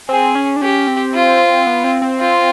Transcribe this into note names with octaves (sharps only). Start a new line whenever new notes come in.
C4 G#4
C#4
D4
C#4 G4
C4
F4
B3
C4
C4
F4